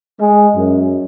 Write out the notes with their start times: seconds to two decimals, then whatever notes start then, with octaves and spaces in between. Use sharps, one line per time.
0.20 G#3
0.55 F#2